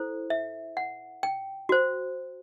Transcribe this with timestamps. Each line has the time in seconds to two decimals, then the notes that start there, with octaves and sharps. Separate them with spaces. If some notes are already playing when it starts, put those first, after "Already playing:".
Already playing: E4 A4 C5
0.30 E5
0.77 F#5
1.23 G5
1.69 F#4 C5